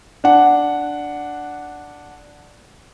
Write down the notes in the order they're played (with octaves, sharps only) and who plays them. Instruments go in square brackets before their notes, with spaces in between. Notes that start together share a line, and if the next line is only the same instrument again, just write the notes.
[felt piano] D4 F#5